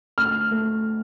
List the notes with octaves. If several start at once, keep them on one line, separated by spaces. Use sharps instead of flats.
D2 F6
A3